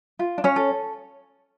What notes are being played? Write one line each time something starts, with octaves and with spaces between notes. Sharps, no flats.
F4
D4
C#4 C#5
A4